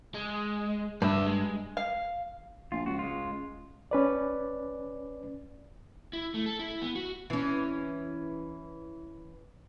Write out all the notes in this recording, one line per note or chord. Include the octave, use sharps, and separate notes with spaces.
G#3
G2 D5 E5
G#3
F5
A#1 F4
C#2 F#4
G#3 F4
C#4 B4 D5
E4
A3
A4
E4
B3
F#4
E3 C#4